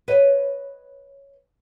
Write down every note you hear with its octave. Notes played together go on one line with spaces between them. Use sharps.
B4 C#5 D#5